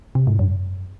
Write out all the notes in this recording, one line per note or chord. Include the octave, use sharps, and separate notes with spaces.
C3
G#2
F#2